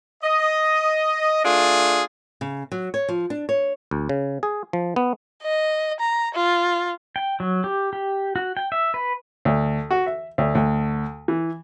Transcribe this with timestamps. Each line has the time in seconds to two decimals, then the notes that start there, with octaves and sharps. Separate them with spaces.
0.22 D#5
1.44 A3 D4 F4 G#4
2.41 C#3
2.72 F#3
2.94 C#5
3.09 F3
3.30 D4
3.49 C#5
3.91 D2
4.09 C#3
4.43 G#4
4.73 F3
4.96 B3
5.43 D#5
6.00 A#5
6.35 F4
7.16 G5
7.40 F#3
7.64 G4
7.93 G4
8.36 F#4
8.57 G5
8.72 E5
8.94 B4
9.45 D2
9.91 F#4
10.06 E5
10.38 D2
10.55 D2
11.28 E3